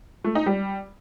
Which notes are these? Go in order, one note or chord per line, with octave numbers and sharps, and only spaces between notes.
A3
D#4
G3